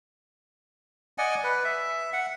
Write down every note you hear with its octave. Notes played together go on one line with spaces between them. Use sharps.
D5 D#5 F#5 G#5
B4
E5
F#5